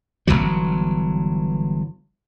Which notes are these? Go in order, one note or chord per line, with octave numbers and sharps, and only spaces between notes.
G1 D#2 E3 F#3